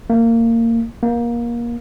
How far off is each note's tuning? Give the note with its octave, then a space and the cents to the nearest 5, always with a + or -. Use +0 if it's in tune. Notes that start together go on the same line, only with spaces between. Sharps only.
A#3 -25
A#3 +20